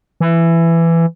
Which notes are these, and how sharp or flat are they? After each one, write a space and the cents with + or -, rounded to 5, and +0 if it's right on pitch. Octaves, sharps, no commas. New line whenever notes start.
E3 +15